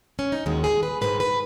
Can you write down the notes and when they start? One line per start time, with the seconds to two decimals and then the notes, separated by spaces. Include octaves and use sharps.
0.19 C#4
0.32 D#4
0.46 D#2 D#3 G#3 F#4
0.64 G#4
0.83 B4
1.01 G#2 D#3 G#3 B4
1.20 B4